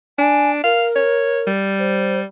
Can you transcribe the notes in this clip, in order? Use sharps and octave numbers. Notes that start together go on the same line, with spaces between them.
D4 G#5
A#4 F5
C#5
G3
C5